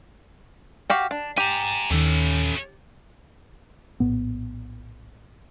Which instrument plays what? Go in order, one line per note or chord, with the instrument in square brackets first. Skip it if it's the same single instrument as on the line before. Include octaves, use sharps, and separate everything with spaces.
[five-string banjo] F#4 G4 F5
D4
[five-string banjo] G4 [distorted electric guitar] G#5 A#5
[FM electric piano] D#2 D#3 [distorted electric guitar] C#4 A4
[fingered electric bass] A#1 A2 B3